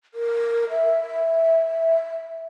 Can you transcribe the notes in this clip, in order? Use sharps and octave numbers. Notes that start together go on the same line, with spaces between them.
A#4
E5